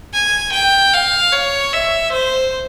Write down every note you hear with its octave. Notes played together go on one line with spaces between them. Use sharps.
G#5
G5
F5
C#5
E5
C5